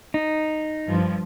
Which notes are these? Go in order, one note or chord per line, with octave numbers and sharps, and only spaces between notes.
D#4
G2 F3